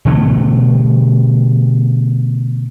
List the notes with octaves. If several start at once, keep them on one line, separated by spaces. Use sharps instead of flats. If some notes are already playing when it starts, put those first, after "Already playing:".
B2 D3 E3 A3